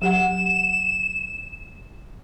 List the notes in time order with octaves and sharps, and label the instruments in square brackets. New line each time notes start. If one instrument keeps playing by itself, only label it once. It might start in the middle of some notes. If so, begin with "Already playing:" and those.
[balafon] F#3 G4 F#5 [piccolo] E7